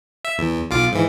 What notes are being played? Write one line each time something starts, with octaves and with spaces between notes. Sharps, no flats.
E5
E2
B1 F4 D6
G#2 E3